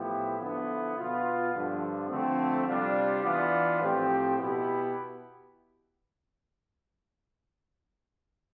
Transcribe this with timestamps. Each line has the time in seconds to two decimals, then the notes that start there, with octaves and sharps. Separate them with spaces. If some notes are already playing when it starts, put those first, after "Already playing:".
Already playing: A2 F3 B3 E4 G4
0.39 D3 F3 B3 E4
0.96 B2 B3 F4
1.53 G2 D3 F3
2.09 D3 F3 A3 C4
2.66 C3 G3 D4 F4
3.23 E3 B3 D4 F4
3.80 A2 F3 C4 G4
4.37 B2 B3 E4 G4